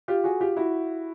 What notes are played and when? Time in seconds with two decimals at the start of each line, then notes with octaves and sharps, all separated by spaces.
0.08 F4 G4
0.24 F#4 G#4
0.40 F4 G4
0.57 E4 F#4